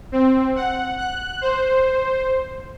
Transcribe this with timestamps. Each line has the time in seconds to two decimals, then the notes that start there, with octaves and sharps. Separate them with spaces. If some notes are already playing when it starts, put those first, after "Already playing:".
0.12 C4
0.56 F#5
0.98 F#6
1.41 C5